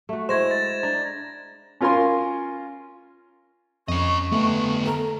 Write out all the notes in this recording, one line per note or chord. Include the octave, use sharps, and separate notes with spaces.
A3 F#4
G#3 E4 C5 G#6 A#6 E7
A6
D4 A#5
C#4 F4 A#4 G#5 C6
F2 C#4 D#5 C#6
D3 A3 B3
A4 A#5